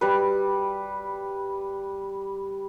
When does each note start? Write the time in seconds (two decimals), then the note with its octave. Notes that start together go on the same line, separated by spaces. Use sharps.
0.01 G3 B4